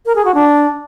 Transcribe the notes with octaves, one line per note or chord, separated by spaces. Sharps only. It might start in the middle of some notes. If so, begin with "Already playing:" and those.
A#4
G#4
F#4
D4